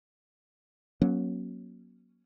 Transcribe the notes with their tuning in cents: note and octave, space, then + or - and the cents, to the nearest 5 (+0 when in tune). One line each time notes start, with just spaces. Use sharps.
F#3 +0 A#3 +35 C#4 -10